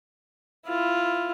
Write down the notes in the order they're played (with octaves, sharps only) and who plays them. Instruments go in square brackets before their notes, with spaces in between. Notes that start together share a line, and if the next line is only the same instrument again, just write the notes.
[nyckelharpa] E4 F4